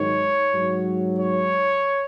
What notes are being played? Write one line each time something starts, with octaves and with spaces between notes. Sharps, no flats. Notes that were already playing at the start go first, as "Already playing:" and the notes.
Already playing: G#2 D#3 F#3 C#5
G#2 F#3
C#5